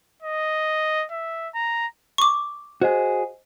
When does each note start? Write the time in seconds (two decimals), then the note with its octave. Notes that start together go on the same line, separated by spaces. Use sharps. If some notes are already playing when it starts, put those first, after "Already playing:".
0.22 D#5
1.11 E5
1.54 A#5
2.18 C#6 D6
2.82 F#4 G#4 C5 D#5